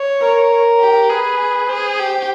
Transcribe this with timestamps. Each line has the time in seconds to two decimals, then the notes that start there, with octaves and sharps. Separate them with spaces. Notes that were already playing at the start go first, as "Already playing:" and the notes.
Already playing: C#5
0.21 A#4
0.80 G4
1.09 G#4 B4
1.69 G#4 C5
1.99 G4